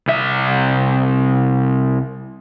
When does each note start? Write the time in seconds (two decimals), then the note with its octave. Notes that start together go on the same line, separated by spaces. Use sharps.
0.07 C2 E5